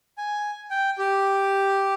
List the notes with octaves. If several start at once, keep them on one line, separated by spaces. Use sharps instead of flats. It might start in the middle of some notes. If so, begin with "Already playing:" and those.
G#5
G5
G4